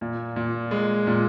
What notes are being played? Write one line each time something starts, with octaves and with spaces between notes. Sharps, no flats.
A#2
A#2
G#3
A#2